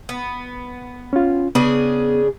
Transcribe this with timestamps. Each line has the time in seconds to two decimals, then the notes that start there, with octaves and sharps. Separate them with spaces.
0.09 B3
1.13 C#4 F4
1.55 C#3 B3 D4 G#4